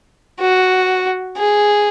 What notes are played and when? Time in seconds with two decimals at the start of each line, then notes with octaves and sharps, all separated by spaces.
0.40 F#4
1.37 G#4